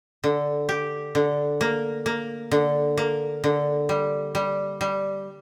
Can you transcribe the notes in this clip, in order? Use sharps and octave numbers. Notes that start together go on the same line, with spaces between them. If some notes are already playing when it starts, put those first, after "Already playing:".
D3
G4
D3
A#3
A#3
D3
A#3
D3
G3
G3
G3